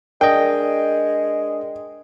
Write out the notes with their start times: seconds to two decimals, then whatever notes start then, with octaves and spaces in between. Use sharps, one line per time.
0.21 G#3 D4 A#4 D5 D#5 G5